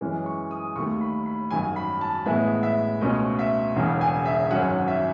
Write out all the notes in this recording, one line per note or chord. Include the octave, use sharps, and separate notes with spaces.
F#2 E3 G#3 C#4
C#6
D#6
D#2 D#3 A3 C#6
B5
B5
G#1 F#2 D#3 F#3 G#5
B5
A5
A1 A2 G#3 B3 E5
E5
C#2 B2 A3 C#4 D#5
E5
E1 E2 C#3 G#3 C#4
G#5
E5
G#1 F#2 D#3 F#3 C#4 F#5
F#5
E5